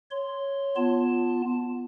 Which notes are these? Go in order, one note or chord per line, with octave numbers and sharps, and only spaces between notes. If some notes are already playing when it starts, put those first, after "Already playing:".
C#5 C6
B3 F4 A5